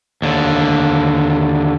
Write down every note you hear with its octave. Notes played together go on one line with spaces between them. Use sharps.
D#2 D3